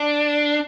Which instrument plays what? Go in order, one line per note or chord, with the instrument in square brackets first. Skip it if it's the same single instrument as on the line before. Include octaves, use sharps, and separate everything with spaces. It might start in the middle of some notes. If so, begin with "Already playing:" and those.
Already playing: [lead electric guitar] D4